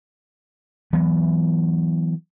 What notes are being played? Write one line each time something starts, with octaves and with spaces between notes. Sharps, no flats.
E3 F#3 B3